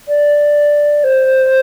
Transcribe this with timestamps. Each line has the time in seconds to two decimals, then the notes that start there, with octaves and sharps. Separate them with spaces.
0.08 D5
1.04 C5